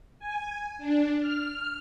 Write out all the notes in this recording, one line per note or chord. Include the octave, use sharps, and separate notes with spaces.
G#5
D4
F6